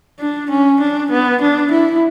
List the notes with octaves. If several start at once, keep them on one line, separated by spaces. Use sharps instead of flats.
D4
C#4
D4
B3
D4
E4